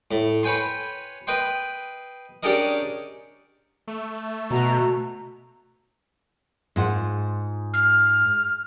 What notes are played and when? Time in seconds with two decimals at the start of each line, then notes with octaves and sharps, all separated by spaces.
0.11 A2
0.43 B4 C#5 G5 G#5 C6
1.27 B4 D#5 G5 C6
2.43 C#4 D4 G4 G#4 A#4 D#5
3.88 A3
4.51 B2 F#4 A#5
6.76 G#2 F4 F#5
7.74 F6